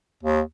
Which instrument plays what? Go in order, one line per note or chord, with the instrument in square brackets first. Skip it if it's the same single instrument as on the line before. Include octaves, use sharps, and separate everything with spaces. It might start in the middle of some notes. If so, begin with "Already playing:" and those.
[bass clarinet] D#2